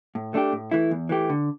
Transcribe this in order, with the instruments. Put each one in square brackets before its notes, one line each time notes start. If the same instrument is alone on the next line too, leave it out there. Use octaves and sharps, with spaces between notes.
[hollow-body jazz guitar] A2
A3 D4 G4
A2
E3 A3 E4
E2
E3 A3 G4
D3